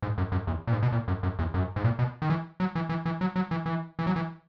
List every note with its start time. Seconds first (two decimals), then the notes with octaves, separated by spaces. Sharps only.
0.02 G#2
0.18 F#2
0.32 F#2
0.47 E2
0.67 A#2
0.72 G#2
0.83 B2
0.92 A#2
1.08 F#2
1.23 F#2
1.39 E2
1.54 F#2
1.76 G#2
1.84 A#2
1.99 B2
2.22 D#3
2.30 E3
2.60 F#3
2.75 E3
2.89 E3
3.06 E3
3.21 F#3
3.36 F#3
3.51 E3
3.66 E3
3.99 E3
4.07 F#3
4.16 E3